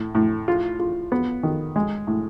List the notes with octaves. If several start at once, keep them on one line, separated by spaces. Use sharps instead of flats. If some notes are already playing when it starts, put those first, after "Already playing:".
Already playing: A2
A2
F4
F4
B3
D#3
G#3
A2